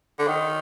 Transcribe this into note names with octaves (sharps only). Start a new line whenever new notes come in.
D3
D#3